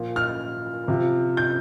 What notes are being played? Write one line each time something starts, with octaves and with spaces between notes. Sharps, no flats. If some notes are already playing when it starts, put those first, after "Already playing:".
Already playing: A#2 F3
F6
C3 F3
G6